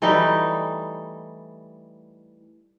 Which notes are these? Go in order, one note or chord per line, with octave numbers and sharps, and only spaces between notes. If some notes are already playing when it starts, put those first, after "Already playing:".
E3 G3 A3 D#4